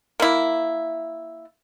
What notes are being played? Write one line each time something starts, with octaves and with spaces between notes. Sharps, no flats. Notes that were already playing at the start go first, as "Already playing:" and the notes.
A#3 E4